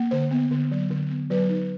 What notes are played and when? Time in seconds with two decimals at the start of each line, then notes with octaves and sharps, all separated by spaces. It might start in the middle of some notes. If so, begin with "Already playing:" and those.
Already playing: A#3
0.11 D3 C5
0.31 B3
0.51 D3
0.71 F#3
0.90 D3
1.10 B3
1.30 F#3 B4
1.49 D#4